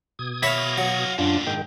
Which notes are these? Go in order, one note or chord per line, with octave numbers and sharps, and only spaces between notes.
B2 D#6 G#6
F#4 C#5 E5 F5 B5
F#3
F#2 A#2 D3 D4 F4
G#2 D#3 G#3 G5